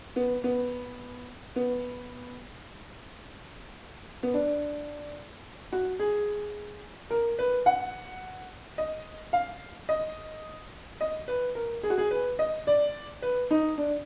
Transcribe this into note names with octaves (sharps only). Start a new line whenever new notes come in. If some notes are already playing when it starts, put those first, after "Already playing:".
B3
B3
B3
B3
D4
F#4
G#4
A#4
B4
F#5
D#5
F5
D#5
D#5
B4
A#4
G#4
F#4
G#4
B4
D#5
D5
B4
D#4
D4